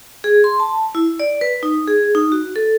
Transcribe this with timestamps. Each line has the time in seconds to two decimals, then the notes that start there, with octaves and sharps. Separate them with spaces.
0.24 G#4
0.44 C6
0.60 A5
0.95 E4
1.20 D5
1.41 B4
1.63 D#4
1.88 G#4
2.15 D#4
2.32 F#4
2.56 A4